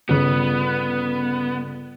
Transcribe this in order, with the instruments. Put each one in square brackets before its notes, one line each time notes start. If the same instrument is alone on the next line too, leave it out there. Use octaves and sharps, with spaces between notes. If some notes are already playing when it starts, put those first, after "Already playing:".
[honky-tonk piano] G1 C#3 [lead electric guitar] B3